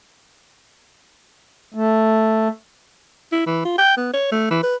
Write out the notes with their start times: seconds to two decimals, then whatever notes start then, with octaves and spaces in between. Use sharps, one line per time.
1.74 A3
3.32 E4
3.46 E3
3.65 F4
3.78 G5
3.97 B3
4.14 C#5
4.32 A3
4.50 E3
4.63 B4